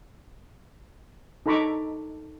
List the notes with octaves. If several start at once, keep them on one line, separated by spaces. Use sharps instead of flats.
D#4 A4 A#5 B5 C#6 D6